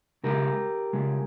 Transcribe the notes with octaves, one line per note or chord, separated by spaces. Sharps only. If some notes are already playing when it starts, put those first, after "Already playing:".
C#3 G#3 G4 A#4
C#3 G#3